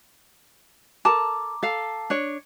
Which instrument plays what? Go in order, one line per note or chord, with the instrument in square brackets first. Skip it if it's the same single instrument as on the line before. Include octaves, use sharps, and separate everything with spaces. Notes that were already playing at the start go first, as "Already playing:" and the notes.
[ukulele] A4 A#4 A5 [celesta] A#5 D6
[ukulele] A4 F5
D4 C#5